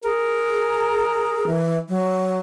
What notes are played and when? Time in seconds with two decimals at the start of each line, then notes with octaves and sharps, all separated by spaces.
0.04 G#4 A#4
1.47 E3
1.89 F#3